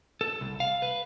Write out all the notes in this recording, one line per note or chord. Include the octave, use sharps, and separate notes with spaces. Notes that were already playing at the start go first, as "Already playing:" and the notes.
A4
C2
F5
B4